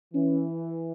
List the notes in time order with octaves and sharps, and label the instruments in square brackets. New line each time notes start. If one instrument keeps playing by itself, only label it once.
[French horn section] E3 [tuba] C#4